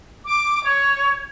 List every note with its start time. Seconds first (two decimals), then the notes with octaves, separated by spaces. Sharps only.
0.25 D6
0.64 C#5